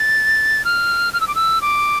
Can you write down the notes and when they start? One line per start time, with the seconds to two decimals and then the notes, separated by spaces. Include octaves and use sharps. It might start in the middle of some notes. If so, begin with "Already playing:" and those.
Already playing: A6
0.65 F6
1.13 F6
1.21 E6
1.27 D6
1.35 E6
1.61 D6